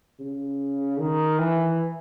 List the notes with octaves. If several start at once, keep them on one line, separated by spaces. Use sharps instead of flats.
C#3
D#3
E3